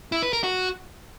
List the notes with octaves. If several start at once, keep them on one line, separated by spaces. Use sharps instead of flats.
E4
B4
A#4
F#4